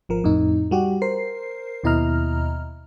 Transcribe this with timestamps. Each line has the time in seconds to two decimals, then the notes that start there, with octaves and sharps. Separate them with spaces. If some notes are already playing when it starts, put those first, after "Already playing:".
0.09 G#1 F3 A#4
0.24 F2 A2 D#4
0.71 G3 F#4 G4
1.02 A#4 C5 C7
1.84 D#2 B2 E4 D#5 A#5 F6